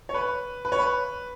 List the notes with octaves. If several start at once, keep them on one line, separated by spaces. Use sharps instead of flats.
C#5
B4
B4
C#5
B4